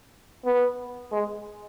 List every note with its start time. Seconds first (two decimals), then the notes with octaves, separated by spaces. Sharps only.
0.45 B3
1.12 G#3